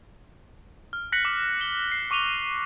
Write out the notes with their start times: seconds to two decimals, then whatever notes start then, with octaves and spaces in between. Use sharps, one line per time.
0.93 F6
1.12 F#6 A#6 B6 C#7 F#7
1.25 D6
1.60 C#7 G7
1.92 C7
2.11 C#6 D6 D#7 F7 G7